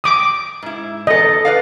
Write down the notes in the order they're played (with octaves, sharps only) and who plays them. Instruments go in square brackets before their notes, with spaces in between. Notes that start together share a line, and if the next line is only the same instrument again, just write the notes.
[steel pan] D6 D#6
[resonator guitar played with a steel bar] G#2 E4
[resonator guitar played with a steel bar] E2 A4 [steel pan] D#5
[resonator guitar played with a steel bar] B4 D5 F5